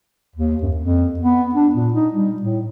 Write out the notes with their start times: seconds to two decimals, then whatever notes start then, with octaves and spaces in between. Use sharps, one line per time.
0.35 D#2
0.63 F#2
0.76 F2
1.19 B3
1.54 D4
1.75 A#2
1.94 D#4
2.13 G3
2.42 A2